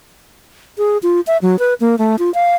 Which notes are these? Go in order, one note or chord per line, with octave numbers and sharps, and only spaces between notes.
G#4
F4
E5
F#3
B4
A#3
A3
F4
F5